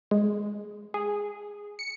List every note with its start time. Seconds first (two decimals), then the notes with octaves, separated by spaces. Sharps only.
0.11 G#3
0.94 G#4
1.79 C#7